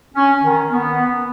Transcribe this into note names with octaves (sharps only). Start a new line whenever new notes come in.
C#4
D#3
B3